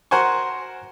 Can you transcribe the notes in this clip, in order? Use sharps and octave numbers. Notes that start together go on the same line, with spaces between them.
F#4 A#4 C5 F#5 G#5 C#6